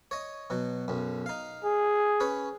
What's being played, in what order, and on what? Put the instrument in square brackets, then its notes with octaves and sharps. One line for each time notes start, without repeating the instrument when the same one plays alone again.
[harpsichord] C#5 D#5
B2 F#3
B1 F#2
D#4 F5
[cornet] G#4
[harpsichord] C#4 B4 C#5